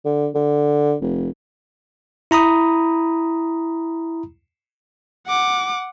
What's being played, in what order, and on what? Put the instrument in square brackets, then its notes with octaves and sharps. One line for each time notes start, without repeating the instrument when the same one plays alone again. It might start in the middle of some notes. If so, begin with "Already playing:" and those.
[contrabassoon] D3
D3
F1
[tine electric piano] E4 A#5 B5 D#6
[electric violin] F#5 D6